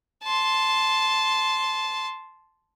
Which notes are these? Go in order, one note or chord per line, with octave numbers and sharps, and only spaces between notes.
A5 C6